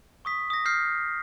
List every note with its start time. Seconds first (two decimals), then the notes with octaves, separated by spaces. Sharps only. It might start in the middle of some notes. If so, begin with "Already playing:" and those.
0.25 C#6 D#6 B6
0.50 D#6 A#6
0.65 F6 G6 C7